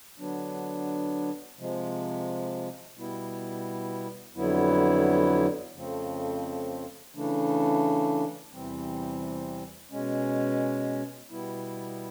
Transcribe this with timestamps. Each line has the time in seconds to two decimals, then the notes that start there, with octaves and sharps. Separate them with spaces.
0.19 D3 F#3 B3 D4
1.58 C3 F3 G#3
2.96 B2 G3 B3 E4
4.35 F2 D3 F#3 B3 E4
5.74 F2 C#3 F3 A3 C4
7.14 C#3 E3 A3 D4
8.52 E2 C3 E3 G3 C4
9.91 B2 G#3 C#4
11.31 B2 G3 B3 E4